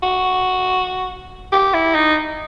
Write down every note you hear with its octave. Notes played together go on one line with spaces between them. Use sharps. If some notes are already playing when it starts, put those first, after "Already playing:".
F#4
G4
E4
D#4